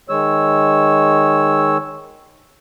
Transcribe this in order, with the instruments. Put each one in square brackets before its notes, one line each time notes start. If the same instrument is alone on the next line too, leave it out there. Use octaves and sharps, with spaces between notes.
[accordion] D#3 G#3 C#5 E6